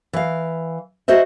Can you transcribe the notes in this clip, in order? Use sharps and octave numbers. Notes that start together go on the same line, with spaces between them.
E3 F5
F#4 C5 D#5 E5